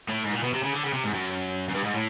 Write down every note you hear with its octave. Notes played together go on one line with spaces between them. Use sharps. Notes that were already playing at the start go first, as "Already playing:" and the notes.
A2
G#2
A#2
B2
C3
C#3
D3
C#3
C3
G#2
F#2
F#2
G2
G#2
A2